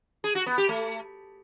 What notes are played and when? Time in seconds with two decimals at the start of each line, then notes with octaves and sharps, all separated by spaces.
0.24 G#4
0.35 F#4
0.46 B3
0.58 G4
0.69 A3